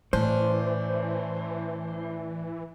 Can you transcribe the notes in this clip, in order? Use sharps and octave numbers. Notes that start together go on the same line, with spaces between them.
A2 E3 C#4 D4 C5